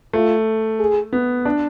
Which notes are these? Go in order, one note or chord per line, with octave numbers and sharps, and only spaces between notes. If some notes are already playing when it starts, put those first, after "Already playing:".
A3 F4
G#4
B3
D4